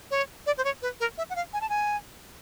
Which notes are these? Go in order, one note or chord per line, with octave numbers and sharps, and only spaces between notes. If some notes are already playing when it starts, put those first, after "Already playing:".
C#5
D5
C5
C#5
B4
A#4
E5
F#5
F5
G#5
A5
G#5